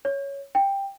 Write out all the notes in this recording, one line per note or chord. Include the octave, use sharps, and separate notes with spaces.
C#5
G5